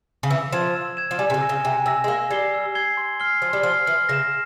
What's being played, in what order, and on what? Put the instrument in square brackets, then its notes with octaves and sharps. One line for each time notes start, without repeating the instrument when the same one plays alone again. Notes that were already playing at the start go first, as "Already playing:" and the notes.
[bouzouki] C#3
[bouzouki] E3 [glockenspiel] E6
[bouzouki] F3 [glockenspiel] G#6 E7
[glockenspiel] E6
G#6 E7
[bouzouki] F3
[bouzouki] G3 [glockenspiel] G#5
[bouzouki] C3
C#3
[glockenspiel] E6 A#6 E7
[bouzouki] C#3
[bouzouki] C3 [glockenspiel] G#5
[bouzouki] C3 [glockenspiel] E6 A#6 E7
[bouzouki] G#3
[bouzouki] A#3 [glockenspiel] E6
[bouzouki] G3 [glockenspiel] G#6 C7 G7
[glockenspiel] E6
G#6 C7 G7
C6
F6 C7 G7
[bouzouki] F3 [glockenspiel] C6
[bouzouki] G3
[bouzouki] F3 [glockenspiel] F6 C7 G7
[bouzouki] E3 [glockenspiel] F6
[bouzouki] C#3 [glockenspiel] A#6
[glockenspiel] E7